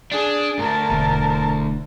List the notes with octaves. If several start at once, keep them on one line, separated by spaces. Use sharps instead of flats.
D4 G#4
D2 G#2 A#4 A5
E1 D3